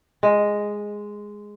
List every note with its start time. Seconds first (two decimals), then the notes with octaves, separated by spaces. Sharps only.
0.23 G#3